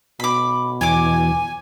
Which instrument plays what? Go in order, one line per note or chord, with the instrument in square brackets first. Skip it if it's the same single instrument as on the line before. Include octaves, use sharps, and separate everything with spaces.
[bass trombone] B2 [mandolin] B5 D6
[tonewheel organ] E2 E3 [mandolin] C#5 D6 [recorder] G#5